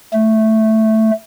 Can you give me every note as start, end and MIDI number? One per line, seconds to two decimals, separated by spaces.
0.13 1.11 57